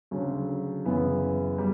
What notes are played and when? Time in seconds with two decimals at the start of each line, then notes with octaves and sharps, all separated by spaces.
0.11 D2 C#3 F#3
0.85 F#2 C#3 E3 B3
1.58 G3